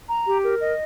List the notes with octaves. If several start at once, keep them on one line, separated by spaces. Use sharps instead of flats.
A#5
G4
A#4
D#5